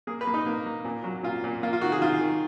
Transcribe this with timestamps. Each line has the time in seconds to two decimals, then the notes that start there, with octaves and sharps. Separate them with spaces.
0.07 A#3 G#4
0.21 B4
0.27 A#3
0.34 D#4
0.46 A#3
0.66 A#3
0.85 A#2
1.04 F#3
1.23 A#2 F4
1.44 A#2
1.63 A#3 F4
1.73 F4
1.81 D#3 F#4
1.92 G#4
2.01 D#3 F4
2.21 D#3